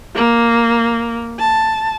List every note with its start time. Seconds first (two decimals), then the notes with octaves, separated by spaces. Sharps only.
0.15 A#3
1.39 A5